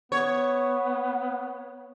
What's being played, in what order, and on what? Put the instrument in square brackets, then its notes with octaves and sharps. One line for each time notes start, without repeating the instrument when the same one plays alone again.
[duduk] B3 [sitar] C#5